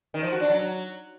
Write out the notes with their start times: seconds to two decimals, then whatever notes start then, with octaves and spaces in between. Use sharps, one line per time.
0.14 D#3
0.23 F3
0.32 F#4
0.41 D4
0.50 F#3